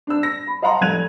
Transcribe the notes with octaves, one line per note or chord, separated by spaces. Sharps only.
D4 E6
A#6
B5
D#5 F5 F#5 A5 A#5 C6
F1 F#6 G#6 D#7 F7